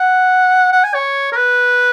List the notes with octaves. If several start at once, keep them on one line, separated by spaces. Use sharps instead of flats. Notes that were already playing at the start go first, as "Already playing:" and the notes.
Already playing: F#5
F#5
G#5
C#5
A#4
B4